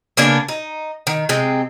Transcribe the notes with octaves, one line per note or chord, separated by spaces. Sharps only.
C#3 A#3 B3 D4
D#4
D#3
C3 G#3 C4